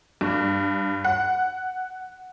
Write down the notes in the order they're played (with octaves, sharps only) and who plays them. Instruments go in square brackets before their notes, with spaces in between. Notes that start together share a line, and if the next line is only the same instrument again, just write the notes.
[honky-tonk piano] G2
F#5